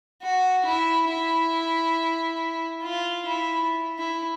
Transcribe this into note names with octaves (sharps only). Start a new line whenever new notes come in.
F#4
E4
E4
F4
E4
E4